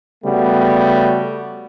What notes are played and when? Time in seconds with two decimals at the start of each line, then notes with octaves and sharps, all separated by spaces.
0.24 C#3 G3 A3 B3 F#4